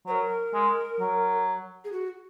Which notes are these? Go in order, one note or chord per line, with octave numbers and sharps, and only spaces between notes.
F#3 A#4 C5
G#3
F#3
G#4
F#4